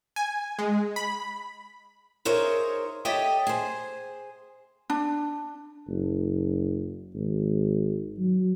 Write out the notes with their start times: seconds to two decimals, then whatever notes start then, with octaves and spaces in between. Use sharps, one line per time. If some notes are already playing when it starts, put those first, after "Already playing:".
0.16 G#5
0.59 G#3
0.96 B5
2.25 D#4 G#4 A#4 C5 C#5 E5
3.05 G4 A4 C#5 D#5 E5 G5
3.47 G#4 C5
4.90 D4
5.88 F#1
7.14 G#1
8.19 F#3